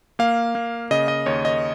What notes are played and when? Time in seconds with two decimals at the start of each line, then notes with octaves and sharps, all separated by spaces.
0.19 A#3 F5
0.55 A#3
0.91 C#3 D#5
1.08 D#5
1.26 D#2 C#5
1.45 D#5